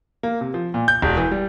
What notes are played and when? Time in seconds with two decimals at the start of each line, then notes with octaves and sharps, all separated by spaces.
0.23 A#3
0.41 C3
0.54 F3
0.74 A#2
0.88 G6
1.02 E1
1.17 E3
1.31 G3